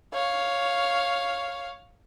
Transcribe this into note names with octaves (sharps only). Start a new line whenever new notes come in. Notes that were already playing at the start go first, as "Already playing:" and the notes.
C#5 F5